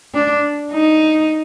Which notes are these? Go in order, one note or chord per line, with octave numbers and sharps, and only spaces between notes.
D4
D#4